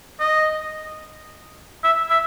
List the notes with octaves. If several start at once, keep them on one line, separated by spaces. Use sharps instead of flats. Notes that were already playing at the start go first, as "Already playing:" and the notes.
D#5
E5
E5